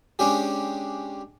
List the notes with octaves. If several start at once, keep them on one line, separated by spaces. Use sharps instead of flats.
G#3 C#4 D4 G4 G#4